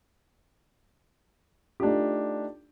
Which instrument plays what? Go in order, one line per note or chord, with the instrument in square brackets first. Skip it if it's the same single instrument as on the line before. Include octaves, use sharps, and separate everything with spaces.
[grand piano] A3 D4 D#4 F4 G4